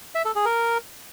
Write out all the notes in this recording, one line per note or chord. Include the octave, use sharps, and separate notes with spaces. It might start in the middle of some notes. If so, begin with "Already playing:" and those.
E5
A4
G#4
A#4